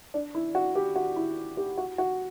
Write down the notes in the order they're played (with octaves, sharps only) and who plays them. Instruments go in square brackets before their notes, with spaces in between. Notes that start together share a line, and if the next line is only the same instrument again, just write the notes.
[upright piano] D4
E4
F#4
G4
F#4
E4
G4
F#4
F#4